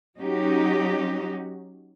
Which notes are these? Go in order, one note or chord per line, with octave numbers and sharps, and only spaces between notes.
F#3 C#4 D#4 F#4 G4